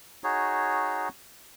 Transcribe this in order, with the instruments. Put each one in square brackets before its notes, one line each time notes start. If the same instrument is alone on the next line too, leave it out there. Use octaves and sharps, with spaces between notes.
[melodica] D#4 F#4 G#4 C#5